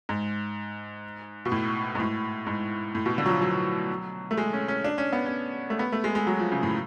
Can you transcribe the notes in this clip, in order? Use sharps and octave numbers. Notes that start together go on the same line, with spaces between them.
G#2
B2
A2
G#2
A2
G#2
A2
B2
D3
F#3
F3
F#3
A3
G#3
C#4
C#4
D4
C#4
B3
C#4
A3
B3
A3
G#3
G#3
F#3
F3
C#3
A2